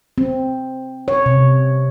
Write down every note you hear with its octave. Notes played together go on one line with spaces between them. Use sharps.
C4
C#5
C3